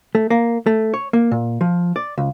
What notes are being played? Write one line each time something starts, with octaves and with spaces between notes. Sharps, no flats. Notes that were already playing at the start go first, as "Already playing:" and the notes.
A3
A#3
A3
C#5
A#3
A#2
F3
D5
C#2